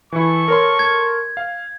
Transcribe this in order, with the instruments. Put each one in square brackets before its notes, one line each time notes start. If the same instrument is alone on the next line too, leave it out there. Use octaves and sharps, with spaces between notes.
[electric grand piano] E3 E4 [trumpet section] A4 C#6
[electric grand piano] A#4 C#5 C6
[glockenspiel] G#6
[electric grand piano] F5